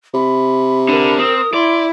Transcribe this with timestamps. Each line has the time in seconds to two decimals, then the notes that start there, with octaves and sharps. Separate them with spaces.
0.14 C3 B5
0.89 D3 A#4
1.19 C4 D#6
1.54 E4 D5 C6